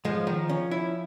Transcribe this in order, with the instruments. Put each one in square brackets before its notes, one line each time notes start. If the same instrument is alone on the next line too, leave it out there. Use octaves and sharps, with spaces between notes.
[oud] F3 [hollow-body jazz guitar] G#3
[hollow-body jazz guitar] D#3
C#4
E4